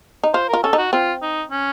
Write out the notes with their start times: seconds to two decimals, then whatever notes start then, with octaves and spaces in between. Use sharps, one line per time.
0.23 D#4
0.34 F4 C5
0.48 A#4
0.53 F4
0.63 C#4 A4
0.73 D#4 F#4
0.92 C4 F4
1.22 D#4
1.51 C#4